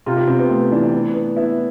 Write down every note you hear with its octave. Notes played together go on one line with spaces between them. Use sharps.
C3 F4
G4
C3 C4
B3
A3
E3 D4
B3
B3
B3 E4